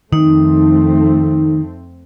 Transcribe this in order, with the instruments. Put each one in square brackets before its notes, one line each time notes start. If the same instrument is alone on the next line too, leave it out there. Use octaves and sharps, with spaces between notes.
[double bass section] F2 A3 C4 [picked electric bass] D#3 [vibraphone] D#4